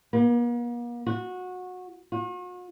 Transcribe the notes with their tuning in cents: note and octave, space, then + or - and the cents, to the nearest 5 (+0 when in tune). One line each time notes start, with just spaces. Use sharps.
A#3 +45
F#4 -20
F#4 -45